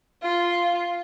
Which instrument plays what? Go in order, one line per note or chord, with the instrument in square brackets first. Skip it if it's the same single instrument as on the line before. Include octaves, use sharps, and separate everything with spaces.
[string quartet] F4